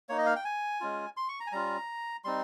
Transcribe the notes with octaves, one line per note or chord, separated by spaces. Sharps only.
A#3 D#4 C#5
D#5
F5
G5
G#5
G#3 C#4 F4
C6
C#6
A#5
G#5
G3 C#4 F4 A#5
G3 C4 D#4 C6